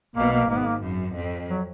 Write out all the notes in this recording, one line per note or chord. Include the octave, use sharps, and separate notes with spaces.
B1 B2 A#3
A#3
G#1 G#2 A#3
B3
A#3
F#2
F2
F#3